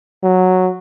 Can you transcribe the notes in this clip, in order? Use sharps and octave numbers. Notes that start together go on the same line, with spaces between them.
F#3